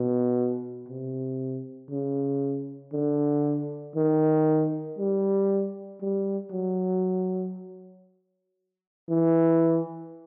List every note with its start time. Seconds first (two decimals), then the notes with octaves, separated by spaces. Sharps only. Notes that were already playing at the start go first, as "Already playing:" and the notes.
Already playing: B2
0.88 C3
1.90 C#3
2.93 D3
3.96 D#3
4.98 G3
6.02 G3
6.52 F#3
9.09 E3